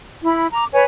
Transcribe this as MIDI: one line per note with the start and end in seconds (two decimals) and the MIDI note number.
0.23 0.46 64
0.23 0.46 83
0.52 0.66 82
0.52 0.66 86
0.73 0.85 71
0.73 0.85 73
0.73 0.85 80